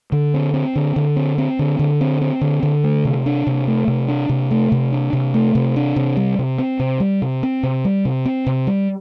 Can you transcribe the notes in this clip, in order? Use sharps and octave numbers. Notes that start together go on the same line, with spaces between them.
D3
C4
C4
D3
D3
C4
C4
D3
D3
C4
C4
D3
D3
A3
C3
D4
C3
A3
C3
D4
C3
A3
C3
D4
C3
A3
C3
D4
C3
G3
C3
C4
C3
G3
C3
C4
C3
G3
C3
C4
C3
G3